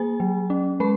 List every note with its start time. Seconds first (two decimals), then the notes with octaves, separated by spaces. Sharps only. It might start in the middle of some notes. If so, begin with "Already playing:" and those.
Already playing: A#3 G#4 G#5
0.20 F#3
0.50 C#4
0.80 G#3 B4 B5